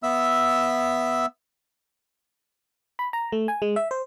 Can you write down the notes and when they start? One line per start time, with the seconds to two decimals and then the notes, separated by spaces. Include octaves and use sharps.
0.03 B3 E5 E6
2.99 B5
3.13 A#5
3.32 A3
3.48 G#5
3.62 G#3
3.76 E5
3.91 C5